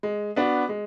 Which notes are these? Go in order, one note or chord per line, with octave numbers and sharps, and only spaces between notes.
G#3
B3 D4 F#4
G#3